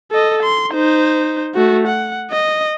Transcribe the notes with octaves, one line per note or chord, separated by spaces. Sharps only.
A4 D#5
C6
D#4 C5
A3 F#4
F#5
D#5